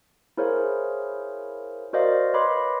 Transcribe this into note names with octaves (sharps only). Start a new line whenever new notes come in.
E4 G#4 A#4 C5 C#5 F5
F#4 A#4 C5 D5 D#5 F5
B4 C#5 D#5 B5 C6 D6